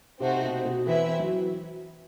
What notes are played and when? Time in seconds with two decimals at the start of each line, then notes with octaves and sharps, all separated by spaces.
0.20 C3 A3 C4 D#4 F#4 C5
0.43 B2
0.65 B2
0.87 E3 C4 E4 B4 E5
1.19 F#3